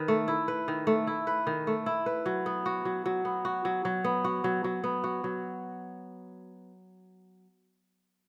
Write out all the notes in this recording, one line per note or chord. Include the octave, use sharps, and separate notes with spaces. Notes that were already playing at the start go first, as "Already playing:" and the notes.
Already playing: D#3 B4
A3
E4
B4
D#3
A3
E4
B4
D#3
A3
E4
B4
F#3
B3
F#4
F#3
F#3
B3
F#4
F#3
F#3
B3
F#4
F#3
F#3
B3
F#4
F#3